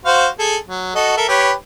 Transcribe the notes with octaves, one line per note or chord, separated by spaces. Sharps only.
F#4 C5 F5
G#4 A4
F#3
F#4 A4 D#5
A4 A#4 E5
G4 B4 C#5